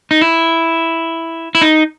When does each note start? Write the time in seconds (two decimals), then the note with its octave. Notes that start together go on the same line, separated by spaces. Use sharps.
0.11 D#4
0.21 E4
1.55 E4
1.62 D#4